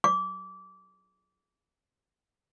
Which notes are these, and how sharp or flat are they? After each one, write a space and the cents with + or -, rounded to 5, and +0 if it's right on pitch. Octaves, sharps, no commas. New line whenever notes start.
D6 -25